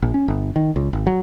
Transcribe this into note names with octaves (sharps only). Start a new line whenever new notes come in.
A#1
C#4
G1
D#3
C#2
G#1
F#3